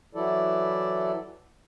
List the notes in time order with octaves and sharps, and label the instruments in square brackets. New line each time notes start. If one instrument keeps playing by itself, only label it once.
[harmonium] E3 F#3 E4 A4 D5